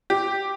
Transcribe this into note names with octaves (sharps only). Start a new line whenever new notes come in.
G4